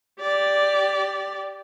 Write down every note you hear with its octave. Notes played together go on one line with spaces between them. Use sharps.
G4 D5